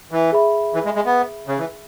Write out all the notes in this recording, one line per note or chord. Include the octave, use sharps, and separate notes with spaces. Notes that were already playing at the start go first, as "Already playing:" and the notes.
E3
G#4 E5 B5
E3
G#3
G#3
B3
C#3
E3